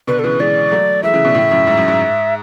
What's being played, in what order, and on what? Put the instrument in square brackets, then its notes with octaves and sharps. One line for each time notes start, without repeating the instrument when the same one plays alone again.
[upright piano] B2 D3 [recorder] B4
[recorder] A4
[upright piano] C#3 E3 [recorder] B4
[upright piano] E3 G#3 [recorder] D5
[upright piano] F#3 A3
[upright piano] E3 G#3 [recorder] E5
[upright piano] C#3 E3
B2 D3
A2 C#3
F#2 A2
G#2
F#2
G#2